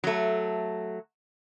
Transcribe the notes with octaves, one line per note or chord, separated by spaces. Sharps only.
F#3 A3